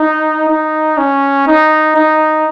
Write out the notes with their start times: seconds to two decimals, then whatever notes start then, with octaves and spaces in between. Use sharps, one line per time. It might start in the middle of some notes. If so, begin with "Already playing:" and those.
Already playing: D#4
0.49 D#4
0.98 C#4
1.48 D#4
1.96 D#4